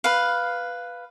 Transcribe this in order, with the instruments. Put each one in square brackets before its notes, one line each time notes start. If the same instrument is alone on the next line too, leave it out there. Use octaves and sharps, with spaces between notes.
[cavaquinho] B4 F5